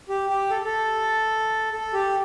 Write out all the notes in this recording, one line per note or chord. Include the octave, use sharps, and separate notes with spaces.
G4
G4
A4
A4
A4
G4